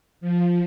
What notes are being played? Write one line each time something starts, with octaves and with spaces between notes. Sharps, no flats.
F3